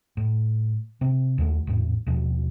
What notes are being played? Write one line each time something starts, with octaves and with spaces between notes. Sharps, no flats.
A2
C3 C4
D#2 D#3 F#3 A3
G#1 E2 A2
D#2 B2 F3